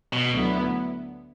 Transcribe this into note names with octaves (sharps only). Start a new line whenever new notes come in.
B2
D2 D3 F#3 B3 E4